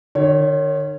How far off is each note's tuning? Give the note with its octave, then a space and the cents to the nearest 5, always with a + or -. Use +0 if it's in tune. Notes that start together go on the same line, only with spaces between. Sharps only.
D#3 -40 C#5 +0